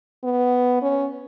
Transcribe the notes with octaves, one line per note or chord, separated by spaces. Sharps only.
B3
C#4